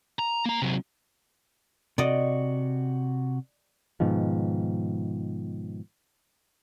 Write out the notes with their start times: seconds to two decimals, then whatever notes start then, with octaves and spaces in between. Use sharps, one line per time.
0.19 A#5
0.46 A#3 A#5
0.62 C3 F#3
1.98 C3 F#4 D5 D#5
4.00 G#2 B2 D#3 F3